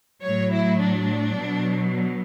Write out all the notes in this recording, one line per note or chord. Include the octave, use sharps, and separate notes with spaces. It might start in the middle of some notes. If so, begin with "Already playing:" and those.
A2 F#3 C#5
E4
D4
B2 F#3